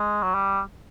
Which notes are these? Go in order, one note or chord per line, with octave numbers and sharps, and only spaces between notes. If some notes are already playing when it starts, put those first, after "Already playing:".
Already playing: G#3
F#3
G3